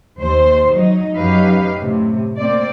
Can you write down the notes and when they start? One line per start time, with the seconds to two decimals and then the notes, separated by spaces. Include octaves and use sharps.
0.20 D#2 C5
0.74 F#3 D#4
1.15 F#2 F#3 D#4 G4 B4 F5
1.79 A2 C3
2.38 A#3 C4 D5